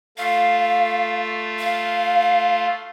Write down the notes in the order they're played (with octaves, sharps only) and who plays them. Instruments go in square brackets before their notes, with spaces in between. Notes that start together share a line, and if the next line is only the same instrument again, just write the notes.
[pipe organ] A3 F4 [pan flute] F5
[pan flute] F5